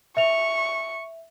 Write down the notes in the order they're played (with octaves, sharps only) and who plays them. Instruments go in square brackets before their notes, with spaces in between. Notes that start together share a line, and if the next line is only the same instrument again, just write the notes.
[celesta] E5 F7 [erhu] C#6